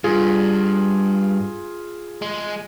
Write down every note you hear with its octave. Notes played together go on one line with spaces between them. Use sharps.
G2 F4 G#4
G#3